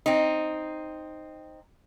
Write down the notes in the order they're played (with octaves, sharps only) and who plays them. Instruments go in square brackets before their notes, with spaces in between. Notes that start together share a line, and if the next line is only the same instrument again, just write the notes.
[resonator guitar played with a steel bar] C4 D#4